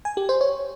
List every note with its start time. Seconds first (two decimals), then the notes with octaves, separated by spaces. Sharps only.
0.05 G#5
0.17 G4
0.29 C5
0.41 C#5